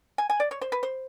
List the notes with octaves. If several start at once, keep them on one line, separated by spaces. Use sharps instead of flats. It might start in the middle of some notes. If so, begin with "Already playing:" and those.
G#5
G#5
D5
C#5
C5
B4
C5